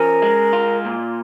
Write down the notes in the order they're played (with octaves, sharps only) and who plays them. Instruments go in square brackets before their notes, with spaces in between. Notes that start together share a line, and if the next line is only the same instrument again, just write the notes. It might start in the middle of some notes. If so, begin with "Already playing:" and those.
Already playing: [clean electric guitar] F3 C#4 [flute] A#4
[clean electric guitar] G#3
F4
A#2